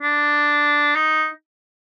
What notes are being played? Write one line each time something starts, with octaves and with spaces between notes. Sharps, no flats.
D4
D#4